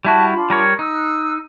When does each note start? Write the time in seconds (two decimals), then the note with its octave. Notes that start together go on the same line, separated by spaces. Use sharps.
0.05 G3 E4 F#4 E5 A5
0.32 D4 F4 B5
0.50 G3 A#4 C#5
0.79 D#4 E6 F#6